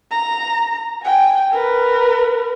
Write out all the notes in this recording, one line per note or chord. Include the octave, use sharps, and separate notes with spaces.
A#5
G5 G#5
A#4 B4